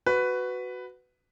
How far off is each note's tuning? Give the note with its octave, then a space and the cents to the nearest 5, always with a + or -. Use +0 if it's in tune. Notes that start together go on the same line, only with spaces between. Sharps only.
F#4 +0 B4 +10